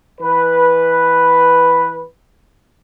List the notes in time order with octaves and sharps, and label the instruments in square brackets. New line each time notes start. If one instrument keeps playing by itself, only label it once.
[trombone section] E3 B4